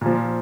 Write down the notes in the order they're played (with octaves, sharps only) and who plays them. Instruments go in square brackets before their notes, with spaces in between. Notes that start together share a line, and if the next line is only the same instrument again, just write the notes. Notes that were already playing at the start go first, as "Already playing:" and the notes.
[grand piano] A#2 F3